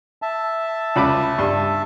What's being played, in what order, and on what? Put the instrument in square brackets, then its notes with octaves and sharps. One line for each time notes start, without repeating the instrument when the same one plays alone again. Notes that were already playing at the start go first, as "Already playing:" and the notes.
[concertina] E5 A5
[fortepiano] C#2 B5 D6
G2